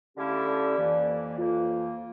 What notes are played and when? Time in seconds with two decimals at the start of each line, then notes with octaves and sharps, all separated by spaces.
0.17 D3 A3 C#4 E4 G4 F5
0.48 D5
0.78 F2 E3 A#3
1.38 F2 E3 A#3 F4